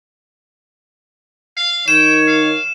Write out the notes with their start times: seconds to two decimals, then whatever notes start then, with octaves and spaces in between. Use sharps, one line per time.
1.57 F5
1.88 D#3 C#5 G5 E7
2.28 F5